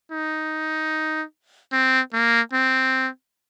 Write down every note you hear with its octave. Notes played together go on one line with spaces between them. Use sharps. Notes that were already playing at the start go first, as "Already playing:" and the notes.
D#4
C4
A#3
C4